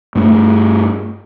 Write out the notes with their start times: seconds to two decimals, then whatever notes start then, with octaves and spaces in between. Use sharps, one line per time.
0.15 G2 A3